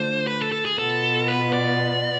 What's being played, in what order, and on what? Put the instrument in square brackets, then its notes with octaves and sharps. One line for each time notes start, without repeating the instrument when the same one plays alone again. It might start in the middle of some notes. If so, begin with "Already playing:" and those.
Already playing: [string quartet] D3 A3 D4 F4 [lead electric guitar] C5
[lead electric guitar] B4
A4
A4
G#4
[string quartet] B2 B3 F4 [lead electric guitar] A4
[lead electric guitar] B4
D5